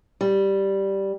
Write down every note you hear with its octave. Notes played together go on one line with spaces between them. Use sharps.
G3